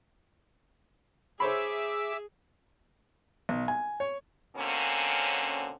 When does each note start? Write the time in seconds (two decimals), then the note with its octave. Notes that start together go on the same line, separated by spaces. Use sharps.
1.40 G#4 C5 C#5 E5 B5 D6 E6
3.49 B1
3.68 G#5
4.00 C#5
4.57 B2 D3 A#3 C4 C#4